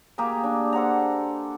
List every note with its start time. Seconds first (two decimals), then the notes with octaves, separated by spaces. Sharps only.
0.18 A#3 G4 G#4 A#5
0.44 D4
0.73 A4 C5 F#5 A#5